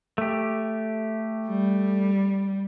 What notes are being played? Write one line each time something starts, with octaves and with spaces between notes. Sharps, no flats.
A3 G4
G3